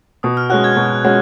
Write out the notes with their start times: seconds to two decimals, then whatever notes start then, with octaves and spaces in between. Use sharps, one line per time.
0.23 B2 D#6
0.37 F6
0.50 G#3 C#4 F#4 F#6
0.64 G#6
0.76 B2
1.04 G#3 C#4 F#4